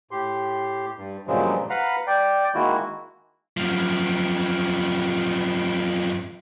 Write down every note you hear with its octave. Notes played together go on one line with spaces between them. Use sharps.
A2 G4 C6
G2
G2 A#2 C#3 F3 F#3 G#3
B4 F5 F#5 A#5 B5
D5 G5
D#3 G#3 A#3 E4 F#4
F#2 F3